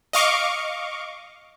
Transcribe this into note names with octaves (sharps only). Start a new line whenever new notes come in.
D#5 F5 C#6 D6